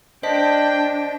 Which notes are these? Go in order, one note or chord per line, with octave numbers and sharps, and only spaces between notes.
D4 C5 D#5 G5 A5 B6